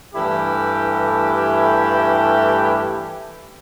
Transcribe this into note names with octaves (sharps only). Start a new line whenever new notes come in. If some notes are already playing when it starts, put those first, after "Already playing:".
G2 E3 A3 E4 G4